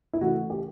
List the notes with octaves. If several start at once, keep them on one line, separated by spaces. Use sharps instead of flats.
E4
C#3 E3 A3 F#4
G4